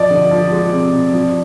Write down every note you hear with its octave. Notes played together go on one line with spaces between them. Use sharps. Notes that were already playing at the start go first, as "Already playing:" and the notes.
Already playing: F3 D5 D#5
D3
F3
G#3
C3
C3
F3